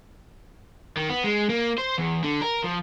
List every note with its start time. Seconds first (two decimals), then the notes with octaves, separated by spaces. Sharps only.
0.97 D#3
1.10 B3
1.24 G#3
1.49 A#3
1.78 C5
1.98 E2
2.24 D3
2.41 A#4
2.64 F3